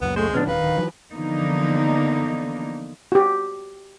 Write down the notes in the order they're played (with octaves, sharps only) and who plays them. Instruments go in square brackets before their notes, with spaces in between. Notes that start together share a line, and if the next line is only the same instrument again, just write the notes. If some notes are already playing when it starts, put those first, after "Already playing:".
[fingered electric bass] C#2 F#2 A#2 [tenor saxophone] B3
[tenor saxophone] G#3 [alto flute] A3 [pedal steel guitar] C5
[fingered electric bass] A2 D3 F3 [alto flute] B3 [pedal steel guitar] C#4 D4
[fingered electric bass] D#1 [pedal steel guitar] D#3 [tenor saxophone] B4 [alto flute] F5
[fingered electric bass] D1
E3 F#3
[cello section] D3 E3 F3 A#3 B3 D#4
[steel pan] F#4 G4